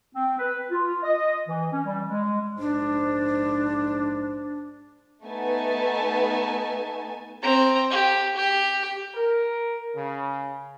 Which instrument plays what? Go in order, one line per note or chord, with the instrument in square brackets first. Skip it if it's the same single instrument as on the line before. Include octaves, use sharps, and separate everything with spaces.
[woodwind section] C4
B4
F4
D#5
E3
C#4
G3
G#3
[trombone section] A#1 G#2 C5 [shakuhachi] D4
[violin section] A3 B3 D#4 G#5 A5
[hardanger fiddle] C4 A#5
G4
G4
[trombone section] A#4
C#3